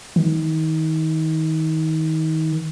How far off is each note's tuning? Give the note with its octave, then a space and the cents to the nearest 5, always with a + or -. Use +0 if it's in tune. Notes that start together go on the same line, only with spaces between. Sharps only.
D#3 +30